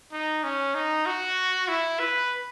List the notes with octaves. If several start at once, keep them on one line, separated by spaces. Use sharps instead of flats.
D#4
C#4
D#4
F#4
E4
B4